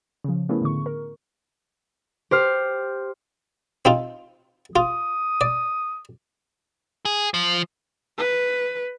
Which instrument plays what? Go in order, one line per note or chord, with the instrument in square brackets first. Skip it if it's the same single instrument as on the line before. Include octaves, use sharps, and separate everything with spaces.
[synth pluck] C#3 F3
A3 B3 C#4 E4 G#4 A#4
A2 D3 C#6
A#4
[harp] G4 C5 F6
[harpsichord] C4 D#4 F4
[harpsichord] F4 [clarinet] D#6
[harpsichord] D5
[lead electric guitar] G#4
F3
[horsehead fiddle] B4